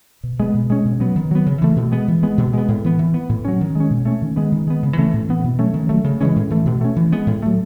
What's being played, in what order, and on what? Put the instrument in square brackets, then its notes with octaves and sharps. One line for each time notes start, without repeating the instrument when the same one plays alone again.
[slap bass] B2
G#3 B3
B2
G#3 C#4
B2
F#3 B3
D#3
F#3 B3
C#3
E3 A3
B2
G#3 B3
E3
G#3 B3
B2
G#3 B3
A2
E3 B3
E3
B3
A2
F#3 C#4
D#3
G#3 C#4
B2
A3 C#4
D#3
G#3 B3
D#3
G#3 B3
C#3
E3 A3 C#4
A2
E3 B3
B2
F#3 A3 C#4
D#3
F#3 A3
C#3
E3 G#3 C#4
A2
E3 A3
B2
A3 C#4
E3
G#3 B3
A2
F#3 A3